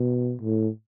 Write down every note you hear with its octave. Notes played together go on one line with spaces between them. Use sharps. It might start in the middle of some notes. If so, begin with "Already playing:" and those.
Already playing: B2
A2